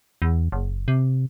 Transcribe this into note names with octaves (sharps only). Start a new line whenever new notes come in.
E2
F#1
C3